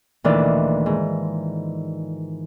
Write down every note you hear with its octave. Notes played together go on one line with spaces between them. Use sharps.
D2 A#2 D#3 E3 F4 D5
G#2